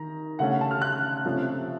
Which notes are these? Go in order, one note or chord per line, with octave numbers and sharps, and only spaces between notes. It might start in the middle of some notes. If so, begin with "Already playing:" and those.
Already playing: D#3 A#5
C#3 A3 C#4 F#5
F#5
A5
F6
F#6
C3 F3 A3 C#4